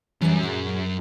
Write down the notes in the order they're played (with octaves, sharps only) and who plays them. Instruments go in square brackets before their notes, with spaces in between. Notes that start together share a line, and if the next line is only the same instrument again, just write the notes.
[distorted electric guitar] F#2 [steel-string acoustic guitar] E3 G3 G#5
[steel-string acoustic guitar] A#2 F#3 G#4